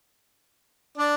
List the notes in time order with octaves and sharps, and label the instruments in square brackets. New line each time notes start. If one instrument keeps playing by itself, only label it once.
[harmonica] D4 D5